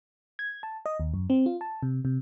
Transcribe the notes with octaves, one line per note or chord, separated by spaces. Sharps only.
G#6
A5
D#5
D#2
F#2
C4
F4
A5
C3
C3